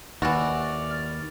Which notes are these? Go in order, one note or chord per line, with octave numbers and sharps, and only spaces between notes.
D#2 E3 F#4 D5 F6